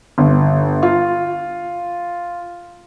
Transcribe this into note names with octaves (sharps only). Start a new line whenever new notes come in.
G1
F4